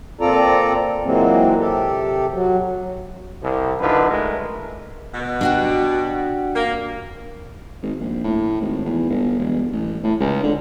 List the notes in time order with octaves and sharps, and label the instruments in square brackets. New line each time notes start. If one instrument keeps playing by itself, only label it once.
[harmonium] A#2 C4 F4 A4 D5 A#5
A#2 E3 F#3 G#3 A#3 C4
C3 G4 A4
F#3
[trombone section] C2
F#2 D3 D#4 F4 B4
G#3 A3 A#4
[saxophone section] B2
[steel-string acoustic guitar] D4 F#4 G4
[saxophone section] A#3
[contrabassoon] G#1
A#1
A2
G#1
E2
G1
E1
A1
A2
C#2
D3